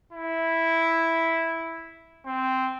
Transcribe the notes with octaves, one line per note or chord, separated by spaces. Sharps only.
E4
C4